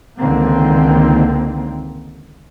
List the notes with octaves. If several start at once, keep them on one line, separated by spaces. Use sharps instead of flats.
C#2 D3 D#3 A#3 C4